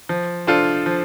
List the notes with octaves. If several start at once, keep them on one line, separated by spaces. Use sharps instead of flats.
F3
D4 F4 A4 C5
F3